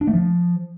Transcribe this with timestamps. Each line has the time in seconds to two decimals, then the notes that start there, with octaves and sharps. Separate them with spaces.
0.01 D4
0.07 A3
0.14 F3